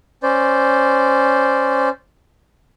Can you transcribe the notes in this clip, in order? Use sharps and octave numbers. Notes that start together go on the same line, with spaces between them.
C#4 C5 D5